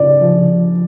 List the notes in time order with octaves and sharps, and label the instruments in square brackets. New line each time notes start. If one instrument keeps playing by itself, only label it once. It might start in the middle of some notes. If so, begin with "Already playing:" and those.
Already playing: [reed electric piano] C#3 [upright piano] D5
[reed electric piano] F3